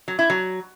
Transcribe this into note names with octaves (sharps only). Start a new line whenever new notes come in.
F#3
E4
F#3